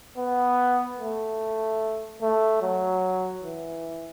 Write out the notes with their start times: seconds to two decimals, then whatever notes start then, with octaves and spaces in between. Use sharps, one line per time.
0.18 B3
0.99 A3
2.21 A3
2.62 F#3
3.43 E3